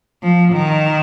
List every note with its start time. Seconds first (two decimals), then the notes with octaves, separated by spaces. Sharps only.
0.23 F3
0.53 D#3